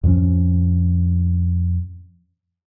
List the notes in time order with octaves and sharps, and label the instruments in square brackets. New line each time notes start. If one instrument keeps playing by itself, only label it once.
[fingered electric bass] F2 A2 F3 C#4